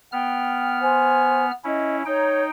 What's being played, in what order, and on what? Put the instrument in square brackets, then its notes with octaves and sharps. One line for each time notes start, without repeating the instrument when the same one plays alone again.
[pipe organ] B3 F6 [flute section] G5
[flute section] C5 G#5
[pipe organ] C#4 E4 [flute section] D#5
[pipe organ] D#4 G5 [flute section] C#5 A#5